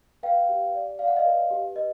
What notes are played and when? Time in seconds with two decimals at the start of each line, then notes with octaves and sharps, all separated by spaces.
0.23 B4 F5 G5
0.49 G4
0.75 D5
0.99 D5 F5
1.08 F#5
1.16 D#5 F5
1.25 B4
1.50 G4
1.76 B4 D#5